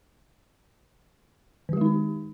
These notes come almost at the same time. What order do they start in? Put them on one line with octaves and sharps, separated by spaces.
D#3 G4 G#3 D#4